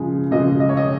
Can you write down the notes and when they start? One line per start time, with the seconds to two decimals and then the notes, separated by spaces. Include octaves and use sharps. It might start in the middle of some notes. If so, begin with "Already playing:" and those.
Already playing: C#3 F3 G#3
0.31 C#3 F3 G#3 D#5
0.60 D#5
0.69 C#5
0.77 D#5